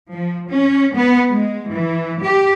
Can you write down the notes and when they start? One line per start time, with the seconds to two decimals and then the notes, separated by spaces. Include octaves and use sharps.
0.12 F3
0.49 C#4
0.96 B3
1.30 G#3
1.71 E3
2.22 G4